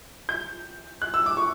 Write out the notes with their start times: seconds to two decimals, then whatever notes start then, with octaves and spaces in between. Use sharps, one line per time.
0.29 G6
1.02 F#6
1.14 E6
1.26 D6
1.37 C#6